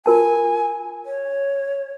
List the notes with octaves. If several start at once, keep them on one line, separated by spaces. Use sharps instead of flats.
F4 A#4 G#5 A5
C#5